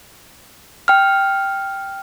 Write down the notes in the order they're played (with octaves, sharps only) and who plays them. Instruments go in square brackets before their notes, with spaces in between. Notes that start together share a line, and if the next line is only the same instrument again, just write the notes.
[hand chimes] G5 F6